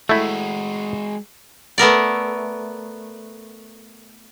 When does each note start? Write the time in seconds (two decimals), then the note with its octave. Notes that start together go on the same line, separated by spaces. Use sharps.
0.09 G#3 A3 E4 F#4
1.78 A3 B3 A#4 D5